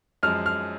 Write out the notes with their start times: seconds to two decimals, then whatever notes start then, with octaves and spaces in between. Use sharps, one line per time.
0.23 F#2 F3 G#3 F6
0.46 F6